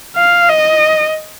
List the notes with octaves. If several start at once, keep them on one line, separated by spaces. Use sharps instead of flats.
F5
D#5